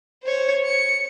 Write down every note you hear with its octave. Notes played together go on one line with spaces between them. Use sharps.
C5 C#5
C#7